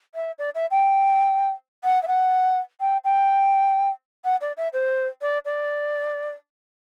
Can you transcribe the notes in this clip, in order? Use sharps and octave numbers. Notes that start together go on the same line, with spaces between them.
E5
D5
E5
G5
F#5
E5
F#5
G5
G5
F#5
D5
E5
C5
D5
D5